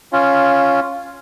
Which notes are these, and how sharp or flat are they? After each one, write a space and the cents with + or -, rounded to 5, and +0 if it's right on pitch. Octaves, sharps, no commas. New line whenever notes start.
C#4 +0 F4 +0